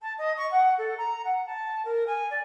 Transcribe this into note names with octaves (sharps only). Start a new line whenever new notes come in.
A5
D#5
C#6
F#5
A4
A#5
F#5
A5
A#4
G#5
D5